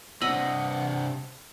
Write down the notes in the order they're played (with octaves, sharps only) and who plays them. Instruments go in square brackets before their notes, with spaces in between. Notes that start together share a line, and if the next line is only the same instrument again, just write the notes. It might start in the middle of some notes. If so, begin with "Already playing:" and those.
[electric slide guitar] C3 C4 D4 [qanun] D#5 B5 [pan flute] F#5 [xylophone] E6